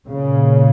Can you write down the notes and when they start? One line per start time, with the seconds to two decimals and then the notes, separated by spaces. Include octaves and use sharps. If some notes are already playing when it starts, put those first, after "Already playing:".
0.10 A#2 C#3